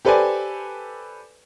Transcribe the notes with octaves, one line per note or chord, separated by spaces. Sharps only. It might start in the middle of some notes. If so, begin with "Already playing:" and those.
G4 A4 B4 C5 D5 G#5